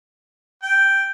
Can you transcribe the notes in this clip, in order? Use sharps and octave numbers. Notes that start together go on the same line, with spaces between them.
G5